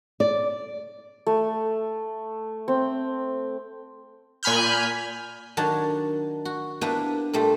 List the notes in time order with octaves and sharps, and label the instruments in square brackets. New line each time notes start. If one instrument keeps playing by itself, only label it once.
[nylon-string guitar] D5
[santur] A3
C4
[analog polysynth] A#2 G#5 B5 F6 G6
[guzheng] D#3 F#3 D4 C#5 F#5 A5
F#4
A#3 B3 D4 E4 G4 B4
A#2 G3 A3 G4